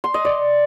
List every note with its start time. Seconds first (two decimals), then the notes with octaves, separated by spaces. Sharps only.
0.04 C6
0.14 D#5
0.25 D5